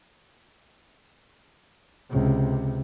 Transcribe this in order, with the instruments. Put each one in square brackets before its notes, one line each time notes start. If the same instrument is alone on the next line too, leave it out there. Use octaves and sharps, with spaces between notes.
[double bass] C#2 C3